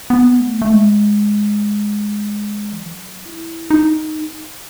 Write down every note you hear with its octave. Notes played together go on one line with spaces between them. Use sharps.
B3
A3
A3
G#3
E3
F#3
E4
D#4